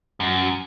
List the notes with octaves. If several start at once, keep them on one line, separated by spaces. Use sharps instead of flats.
F#2